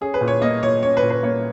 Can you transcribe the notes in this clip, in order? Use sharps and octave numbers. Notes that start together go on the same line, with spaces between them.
C#4 G#4
B4
A#2
C#5
A#3 D#5
A#2 C#5
C#4 C#5
B4
A#2
B4
A#3 C#5